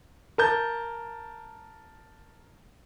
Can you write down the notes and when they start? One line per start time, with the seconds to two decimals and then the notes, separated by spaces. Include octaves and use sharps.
0.38 A#4 A5 G6